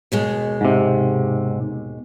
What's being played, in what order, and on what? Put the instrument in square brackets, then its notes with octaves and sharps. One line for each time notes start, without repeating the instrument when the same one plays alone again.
[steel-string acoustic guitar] D#2 B2 G#3
[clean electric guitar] G#2 C3